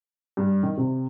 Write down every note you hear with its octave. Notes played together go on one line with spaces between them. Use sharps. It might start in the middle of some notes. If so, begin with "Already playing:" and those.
G2
D#3
C3